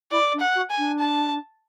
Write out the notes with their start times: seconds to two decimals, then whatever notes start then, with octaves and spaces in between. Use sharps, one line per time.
0.11 E4 D5
0.33 D4
0.40 F#5
0.55 F#4
0.70 G#5
0.77 D4
1.00 A5